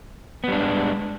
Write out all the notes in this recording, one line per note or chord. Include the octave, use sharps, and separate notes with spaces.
G3 G#3 B3 D4